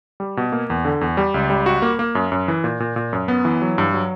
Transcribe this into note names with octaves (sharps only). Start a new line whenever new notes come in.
G3
B2
A#3
E2
D3
E2
G3
C#2
G3
F#4
A#3
A#3
F#2
F#2
E3
A#2
A#2
A#2
F#2
B3
E3
F#3
G2
F#3